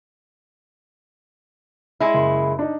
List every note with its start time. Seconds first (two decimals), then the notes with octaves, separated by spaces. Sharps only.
2.00 G#3 E4
2.14 F#1 C6
2.59 D4 D#4